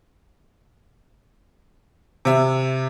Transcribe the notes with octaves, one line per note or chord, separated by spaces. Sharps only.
C3 E5